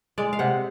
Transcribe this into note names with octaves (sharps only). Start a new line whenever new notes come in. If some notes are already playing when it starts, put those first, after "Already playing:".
G#3 D5
F5
C3 F#5